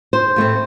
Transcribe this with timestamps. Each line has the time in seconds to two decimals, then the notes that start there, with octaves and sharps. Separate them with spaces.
0.13 C5
0.36 A2 A3 C4